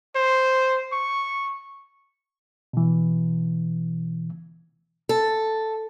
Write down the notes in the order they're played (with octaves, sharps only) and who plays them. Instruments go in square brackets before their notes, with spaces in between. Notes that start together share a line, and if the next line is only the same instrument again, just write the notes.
[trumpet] C5
C#6
[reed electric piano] B2 E3
[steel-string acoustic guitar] A4